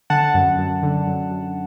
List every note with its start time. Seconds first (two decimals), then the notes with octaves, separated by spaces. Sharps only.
0.10 D3 F#5 A5
0.34 F#2
0.59 F#2
0.83 D3
1.07 F#2
1.31 F#2